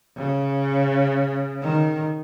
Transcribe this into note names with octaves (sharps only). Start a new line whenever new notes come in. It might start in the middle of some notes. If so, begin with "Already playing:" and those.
C#3
D#3